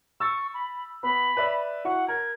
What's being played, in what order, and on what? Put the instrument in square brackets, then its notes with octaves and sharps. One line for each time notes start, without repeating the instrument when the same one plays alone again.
[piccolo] C#6 [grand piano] E6 A6
[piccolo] B5
[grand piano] B3 [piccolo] B5
[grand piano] B4 D5 E5
[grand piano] E4 F#4 C#6 [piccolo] F#5
[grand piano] A#4 [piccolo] G#6